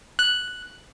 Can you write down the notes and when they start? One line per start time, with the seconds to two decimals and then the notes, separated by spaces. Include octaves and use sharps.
0.19 F#6